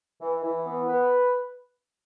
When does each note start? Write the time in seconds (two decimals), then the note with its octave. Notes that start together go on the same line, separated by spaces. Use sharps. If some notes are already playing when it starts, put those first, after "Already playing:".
0.21 E3
0.43 E3
0.65 B3
0.88 B4